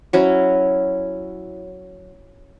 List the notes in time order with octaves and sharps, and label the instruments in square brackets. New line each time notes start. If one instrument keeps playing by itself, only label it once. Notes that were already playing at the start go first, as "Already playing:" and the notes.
[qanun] F#3 C#4 E4